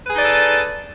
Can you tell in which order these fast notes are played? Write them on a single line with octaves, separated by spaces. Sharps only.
B4 G#4 D#4 D5 A4